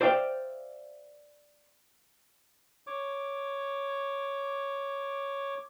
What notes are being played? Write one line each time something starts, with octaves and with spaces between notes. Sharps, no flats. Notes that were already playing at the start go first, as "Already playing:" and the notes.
C5 D5 E5 F5 G5
C#5 D6